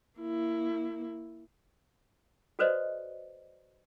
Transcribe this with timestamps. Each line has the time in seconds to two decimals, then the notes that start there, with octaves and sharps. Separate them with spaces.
0.20 A#3 E4
2.59 F#4 A4 B4 C5 D5 D#5